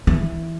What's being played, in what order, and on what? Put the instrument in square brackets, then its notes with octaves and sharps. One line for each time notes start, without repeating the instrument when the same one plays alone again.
[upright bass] E3